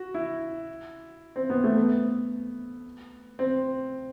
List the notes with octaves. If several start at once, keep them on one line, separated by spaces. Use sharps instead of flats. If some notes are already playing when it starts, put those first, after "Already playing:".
Already playing: F#4
E4
C4
B3
A3
B3
C4